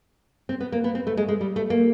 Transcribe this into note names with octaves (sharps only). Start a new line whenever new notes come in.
C4
B3
A#3
B3
C4
A3
G#3
G#3
G3
A3
A#3